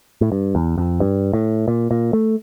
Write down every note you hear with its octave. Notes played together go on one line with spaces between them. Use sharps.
A2
G2
E2
F2
G2
A2
A#2
A#2
A3